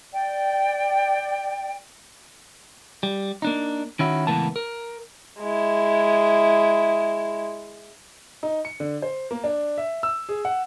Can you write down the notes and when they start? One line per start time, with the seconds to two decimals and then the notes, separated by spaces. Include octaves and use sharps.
0.13 D5 G5
3.03 G3
3.42 A#3 D4 D#4
3.99 D#3 C#4 E4 F#4
4.27 C#2 A2 E3 A#3 B3 A5
4.56 A#4
5.39 G#3 E4
8.43 D#4
8.65 C#7
8.80 D3
9.02 C5
9.31 A#3
9.44 D4
9.78 E5
10.03 E6
10.29 G#4
10.45 F#5